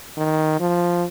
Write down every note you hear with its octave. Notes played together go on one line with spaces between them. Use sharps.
D#3
F3